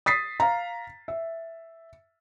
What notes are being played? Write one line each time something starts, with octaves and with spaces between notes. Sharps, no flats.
D#6 A6 B6 C7
F5 A#5
E5